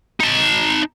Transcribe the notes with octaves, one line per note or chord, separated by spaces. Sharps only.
D#4 A5